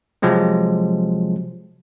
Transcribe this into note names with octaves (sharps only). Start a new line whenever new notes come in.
C3 F3 F#3 G#3 C4